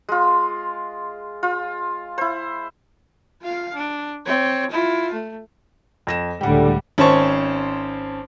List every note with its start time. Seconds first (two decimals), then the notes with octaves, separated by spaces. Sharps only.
0.09 G#3 F4
1.43 F4
2.18 E4 C5
3.42 F4 F5
3.74 D4
4.25 C4 C#5
4.70 E4 F4
5.12 A3
6.07 F2 A#6 E7
6.41 C#2 A2 D3 G3 G4 F#5
6.98 G#1 C#4 C5 A5 C#6